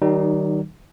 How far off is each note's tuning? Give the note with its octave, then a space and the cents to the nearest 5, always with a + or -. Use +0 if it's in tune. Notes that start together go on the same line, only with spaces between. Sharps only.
D#3 +0 G3 -45 D#4 -25